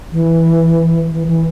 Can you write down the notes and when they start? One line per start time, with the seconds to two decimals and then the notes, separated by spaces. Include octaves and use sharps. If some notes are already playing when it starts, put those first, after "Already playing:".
0.12 E3
1.11 E3
1.27 E3